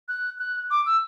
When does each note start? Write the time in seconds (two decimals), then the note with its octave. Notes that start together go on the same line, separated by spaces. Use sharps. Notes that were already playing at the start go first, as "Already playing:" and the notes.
0.08 F#6
0.39 F#6
0.70 D6
0.86 E6